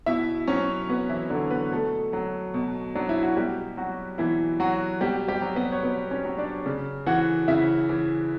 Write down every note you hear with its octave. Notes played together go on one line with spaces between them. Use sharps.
B2 E4 E5
F#3 C#4 C#5
B2 B3 B4
E3 E4
D3 F#3 D4
B3 B4
B2 A3 A4
F#3
B2
F#3 D4
E4
F#4
B2 G3 G4
F#3 F#4
B2 E3 E4
F#3 F#4
B2 G3 G4
G3 G4
F#3
B3 B4
C#5
B2 B3 B4
C#4 C#5
F#3
D4 D5
C#3
E3 F#4 F#5
C#3 E4 E5
E3